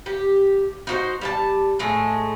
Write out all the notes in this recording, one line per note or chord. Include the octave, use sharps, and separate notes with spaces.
G4
D#4 F#4 C5
G3 G5 A5
A2 G#3 A3